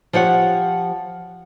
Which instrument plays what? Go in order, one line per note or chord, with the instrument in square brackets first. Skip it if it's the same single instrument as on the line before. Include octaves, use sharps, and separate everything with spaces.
[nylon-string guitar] F3 G4 C#5 F#5